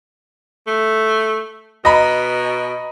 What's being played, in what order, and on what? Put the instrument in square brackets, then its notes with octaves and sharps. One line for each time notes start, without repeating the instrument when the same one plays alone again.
[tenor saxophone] A3
[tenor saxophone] B2 [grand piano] D#5 A#5 B5